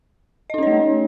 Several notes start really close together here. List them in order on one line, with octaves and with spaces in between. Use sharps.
D#5 D#4 C#4 C#5 A3